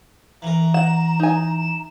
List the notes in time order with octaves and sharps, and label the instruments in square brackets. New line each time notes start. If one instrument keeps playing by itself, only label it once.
[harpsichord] E3 A#4 [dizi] A#5
[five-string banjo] F#5 [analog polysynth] E7
[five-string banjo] D#4 G#5